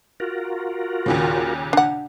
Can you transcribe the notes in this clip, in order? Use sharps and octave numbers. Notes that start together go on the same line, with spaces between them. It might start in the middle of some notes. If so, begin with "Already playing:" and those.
F4 F#4 A#4
D#2 A#2 C#3
D4 F#5